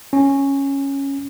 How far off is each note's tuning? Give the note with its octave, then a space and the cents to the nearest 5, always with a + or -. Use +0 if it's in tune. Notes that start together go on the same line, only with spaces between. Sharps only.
C#4 -5